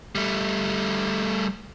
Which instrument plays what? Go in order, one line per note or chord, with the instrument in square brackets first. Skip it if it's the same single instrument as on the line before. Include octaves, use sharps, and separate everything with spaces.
[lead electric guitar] G3 A3